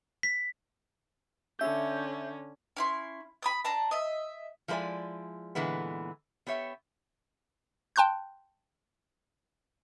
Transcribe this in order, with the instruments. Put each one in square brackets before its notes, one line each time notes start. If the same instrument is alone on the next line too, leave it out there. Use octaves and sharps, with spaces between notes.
[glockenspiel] B6
[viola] D3 C#4 [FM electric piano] E5 G6
[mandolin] C#4 E4 C6
B5 D#6 G6
D4 A5 A#5
D#5 E5
[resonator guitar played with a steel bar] F3 G#3 E4 B4 D5 G#5
A#2 D3 E3 G#3 B3
B3 G4 C#5 E5
[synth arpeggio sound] G5 A5 C6 F#6 G6